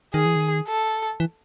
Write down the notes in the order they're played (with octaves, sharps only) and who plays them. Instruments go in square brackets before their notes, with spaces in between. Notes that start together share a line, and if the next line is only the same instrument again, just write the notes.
[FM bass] D#3 [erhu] G#4
[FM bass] E3
D#3
[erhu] A4
[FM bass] E3